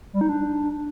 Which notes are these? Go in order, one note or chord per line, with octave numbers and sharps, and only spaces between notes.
G3
D#4
D4